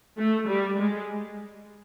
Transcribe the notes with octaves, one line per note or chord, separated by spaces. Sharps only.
A3
G3
G#3